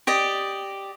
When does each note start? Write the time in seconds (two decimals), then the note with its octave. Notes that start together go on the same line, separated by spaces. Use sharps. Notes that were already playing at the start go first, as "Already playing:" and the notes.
0.07 G4 D5 D#5